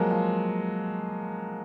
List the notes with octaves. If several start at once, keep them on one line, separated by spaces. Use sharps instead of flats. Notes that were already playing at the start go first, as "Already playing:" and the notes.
Already playing: F3 F#3 G#3 A#3
F3